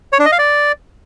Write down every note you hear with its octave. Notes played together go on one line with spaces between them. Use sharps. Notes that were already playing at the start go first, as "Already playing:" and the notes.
C#5
D4
D#5
F5
D5